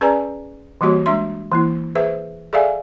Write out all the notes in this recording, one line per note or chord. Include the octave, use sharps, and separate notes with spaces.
C#4 G#4 B4 D5 G#5 A#5
E3 G3 A#3 F#4 G4 C#5
G#3 D4 E5 C6
E3 A#3 E4
G#4 B4 C5 E5
G#4 A4 D5 E5 F5 G#5